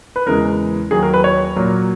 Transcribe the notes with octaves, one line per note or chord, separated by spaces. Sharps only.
B4
E2 C#3 E3 G#3 A#4
D#2 D#3 F#3 G#4
A#4
B4
C#5
A#2 F#3 A#3